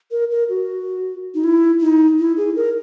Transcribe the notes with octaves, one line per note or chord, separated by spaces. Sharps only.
A#4
A#4
F#4
D#4
E4
D#4
E4
G#4
A#4